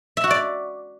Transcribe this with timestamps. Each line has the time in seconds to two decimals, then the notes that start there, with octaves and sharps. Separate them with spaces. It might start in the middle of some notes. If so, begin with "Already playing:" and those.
0.17 E5
0.24 F#4
0.30 D5